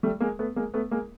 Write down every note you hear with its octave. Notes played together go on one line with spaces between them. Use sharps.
G3 A3
G#3 A#3
A3 B3
G#3 A#3
A3 B3
G#3 A#3